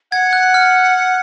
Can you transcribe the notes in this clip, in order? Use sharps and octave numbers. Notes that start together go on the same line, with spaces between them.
F#5 G#6
F#6
F6